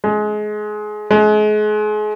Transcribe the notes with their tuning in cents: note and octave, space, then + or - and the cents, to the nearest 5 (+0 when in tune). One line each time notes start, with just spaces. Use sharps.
G#3 +25
G#3 +35